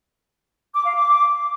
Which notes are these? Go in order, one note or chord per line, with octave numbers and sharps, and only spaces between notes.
D6
F5
D6